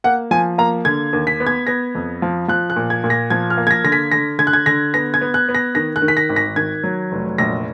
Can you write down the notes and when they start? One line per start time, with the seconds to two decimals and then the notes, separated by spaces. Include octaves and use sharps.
0.04 A#3 F#5
0.31 F3 G#5
0.58 A#3 A#5
0.85 D3 G#6
1.13 D#2
1.27 B6
1.40 B3
1.47 G#6
1.67 B3 A#6
1.95 F2
2.22 F3
2.48 F3 F#6
2.70 F#6
2.76 A#2
2.90 G#6
3.04 A#2
3.10 A#6
3.30 F3 G#6
3.50 F6
3.58 A#3
3.67 G#6
3.71 A#6
3.84 D3 A#6
3.92 B6
4.11 D3 A#6
4.39 D3 G#6
4.47 F#6
4.53 G#6
4.66 D3 A#6
4.94 B3 A#6
5.14 G#6
5.21 B3
5.34 F#6
5.49 B3
5.55 A#6
5.75 D#3 A#6
5.96 F#6
6.02 D#3
6.08 B6
6.17 A#6
6.29 G#1
6.36 A#6
6.56 D#3 G#6
6.84 F#3
7.12 F1
7.38 A#1 A#6